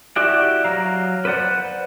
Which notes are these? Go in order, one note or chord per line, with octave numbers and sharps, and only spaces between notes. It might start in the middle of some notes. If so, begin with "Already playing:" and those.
E4 F#4 G4 D5 F#5
F#3 F5 A#5
B4 C5 D5 F#5